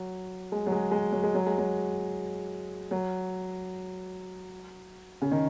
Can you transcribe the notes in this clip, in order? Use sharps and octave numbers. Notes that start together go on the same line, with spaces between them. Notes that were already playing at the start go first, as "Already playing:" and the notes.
Already playing: F#3
G#3
F#3
G#3
G#3
F#3
G#3
F#3
G#3
F#3
F#3
C#3
D#3